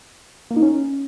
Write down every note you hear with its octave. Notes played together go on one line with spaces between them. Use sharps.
A#3
D#4
C#4